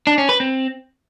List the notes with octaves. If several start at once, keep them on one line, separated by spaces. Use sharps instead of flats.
D4
C#4
B4
C4